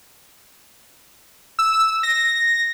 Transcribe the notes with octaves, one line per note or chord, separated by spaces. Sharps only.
E6
A#6